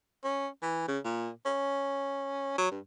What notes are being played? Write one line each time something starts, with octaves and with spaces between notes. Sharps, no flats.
C#4
E3
C#3
A#2
C#4
F#3
G2